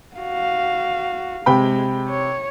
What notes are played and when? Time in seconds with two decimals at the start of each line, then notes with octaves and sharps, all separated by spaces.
0.16 F#4 F5
1.46 C3 G#3 G5 B5
2.10 C#5